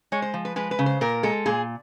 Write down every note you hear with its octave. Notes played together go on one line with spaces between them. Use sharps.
G#3 C#5
C5
F3
B4
G#3 B4
B4
C#3
C5
A#2 A#4
G#3 A4
A#2 G#4